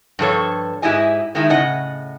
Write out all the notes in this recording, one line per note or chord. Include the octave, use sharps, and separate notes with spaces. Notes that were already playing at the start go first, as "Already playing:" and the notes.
G2 F3 A4 C#5
G#2 E4 G4 G#4 D#5 G#5
D#3 G#3 D#4 E4
A2 C#3 D#5 F#5